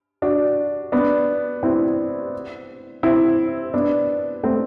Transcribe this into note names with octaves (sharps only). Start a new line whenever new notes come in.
D4 F#4
B3 D4
C4 E4
C4 E4
B3 D4
A3 C4